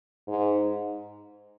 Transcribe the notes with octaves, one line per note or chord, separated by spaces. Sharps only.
G#2